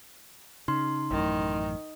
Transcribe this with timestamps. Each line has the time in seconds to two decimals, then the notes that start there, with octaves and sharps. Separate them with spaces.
0.68 C#3 D#4 C6
1.11 A1 F#2 A2 D#3